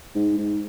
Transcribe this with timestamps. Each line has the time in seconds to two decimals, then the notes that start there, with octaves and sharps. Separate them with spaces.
0.15 G#2
0.38 G#2